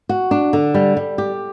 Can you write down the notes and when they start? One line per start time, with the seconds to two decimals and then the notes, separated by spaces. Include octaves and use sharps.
0.09 F#4
0.31 D4
0.53 D3
0.74 G3
0.97 G3
1.18 G4